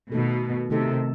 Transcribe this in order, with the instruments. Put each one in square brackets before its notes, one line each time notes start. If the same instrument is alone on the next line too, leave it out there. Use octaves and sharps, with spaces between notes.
[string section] B2 [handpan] D#3 A3 D#4 A4
[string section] C3 [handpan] D#3 A3 D#4 A4